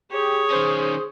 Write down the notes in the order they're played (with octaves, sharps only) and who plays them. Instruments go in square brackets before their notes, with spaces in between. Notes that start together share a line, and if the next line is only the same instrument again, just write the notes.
[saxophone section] G4 [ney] G#4 [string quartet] C#5
[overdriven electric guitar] D#3 C#4 [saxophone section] C5